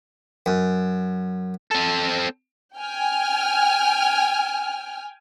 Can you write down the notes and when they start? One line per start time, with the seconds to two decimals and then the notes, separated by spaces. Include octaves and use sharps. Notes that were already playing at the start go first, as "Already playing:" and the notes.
0.46 F#2
1.71 C4 A4
2.78 G5 G#5 F6